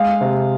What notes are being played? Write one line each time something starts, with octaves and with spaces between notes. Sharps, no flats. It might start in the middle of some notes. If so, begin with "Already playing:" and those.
Already playing: G#3 F5
C3